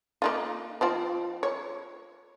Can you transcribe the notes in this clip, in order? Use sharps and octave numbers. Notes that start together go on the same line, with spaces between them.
A#3 D#4 F4
F3 C4 F4
C#5